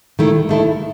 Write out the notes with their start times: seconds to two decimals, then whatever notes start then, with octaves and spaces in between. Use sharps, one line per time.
0.19 D#3 A3 E4
0.49 D#3 A3 E4